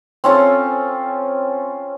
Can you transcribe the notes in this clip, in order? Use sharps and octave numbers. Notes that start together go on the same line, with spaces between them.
C4 C#4 F4 A4